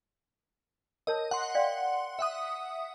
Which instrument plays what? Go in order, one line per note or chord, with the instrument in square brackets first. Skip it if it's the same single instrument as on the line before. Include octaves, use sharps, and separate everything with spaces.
[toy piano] A#4 C#5 A5 [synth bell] D#5
[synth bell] F#5 C6
[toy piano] D5 F5 G5
[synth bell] E5 F#5 D#6